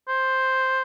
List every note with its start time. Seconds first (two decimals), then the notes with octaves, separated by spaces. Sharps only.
0.08 C5